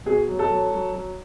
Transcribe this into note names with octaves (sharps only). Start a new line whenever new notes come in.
B2 G#4
F#3
A4
F#3
F#3
F#3